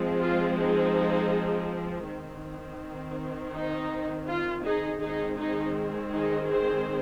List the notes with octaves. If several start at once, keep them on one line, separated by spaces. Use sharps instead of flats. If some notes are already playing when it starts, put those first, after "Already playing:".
Already playing: F3 G#3 C4
F4
D#4 G#4
D#3 C4
D#4
F4
D#4 G#4
D#3 G#3 C4 D#4 G#4
D#4 G#4
D#4 G#4
G#4 C5